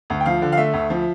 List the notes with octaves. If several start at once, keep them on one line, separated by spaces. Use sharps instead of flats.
D2
G5
F3 F5
D3
F5
A3 E5
D2
F3